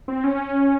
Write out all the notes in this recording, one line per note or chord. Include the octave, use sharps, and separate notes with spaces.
C4
C#4